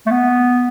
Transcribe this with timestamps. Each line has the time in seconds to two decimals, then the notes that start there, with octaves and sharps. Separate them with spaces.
0.06 A3
0.11 B3